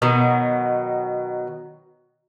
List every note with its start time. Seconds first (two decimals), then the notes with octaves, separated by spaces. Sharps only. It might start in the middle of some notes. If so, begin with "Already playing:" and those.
0.02 B2 D#3 F#3